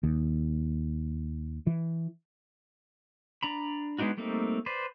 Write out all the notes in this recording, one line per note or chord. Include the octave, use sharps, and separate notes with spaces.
D#2
E3
D4 A#5 B5
G#3 B3 D4 D#4 F#4
G3 A3 A#3 C4 D#4
B4 C5 D5